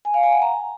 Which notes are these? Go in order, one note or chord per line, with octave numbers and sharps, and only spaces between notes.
G#5
F5
G#5
F#5
A#5